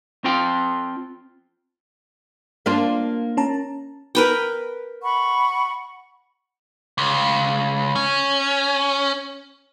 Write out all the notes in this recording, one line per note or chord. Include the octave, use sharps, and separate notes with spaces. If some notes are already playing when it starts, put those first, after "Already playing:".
C4 F4 G5
A#3 D4 F4
C#4 A5 A#5
A#4 B4 G5
F#5 B5 C#6
C#2
C#4